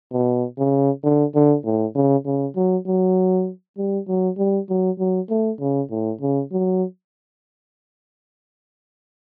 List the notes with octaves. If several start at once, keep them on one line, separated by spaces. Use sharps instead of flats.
B2
C#3
D3
D3
A2
C#3
C#3
F#3
F#3
G3
F#3
G3
F#3
F#3
A3
C#3
A2
C#3
F#3